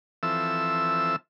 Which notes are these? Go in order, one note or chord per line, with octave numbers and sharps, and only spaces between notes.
E3 F3 C4 A4 E5 E6